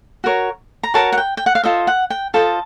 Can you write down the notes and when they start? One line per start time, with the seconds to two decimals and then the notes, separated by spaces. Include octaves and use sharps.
0.24 F#4 A#4 C#5
0.83 A#5
0.94 F#4 A#4 C#5 A5
1.12 F#5
1.18 G5
1.37 G5
1.46 F#5
1.55 F5
1.64 F4 A4 C5 D#5 E5
1.87 F#5
2.10 G5
2.34 F4 A4 C5 D#5 A5